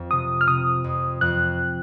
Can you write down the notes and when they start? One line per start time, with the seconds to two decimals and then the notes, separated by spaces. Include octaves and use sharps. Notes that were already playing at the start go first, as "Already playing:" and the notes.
Already playing: F2
0.11 C3 D#6
0.41 F6
0.48 C3 D#6
0.84 F2
1.21 F2 F#6